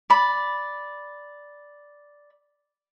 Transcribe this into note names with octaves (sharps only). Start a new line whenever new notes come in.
D5 B5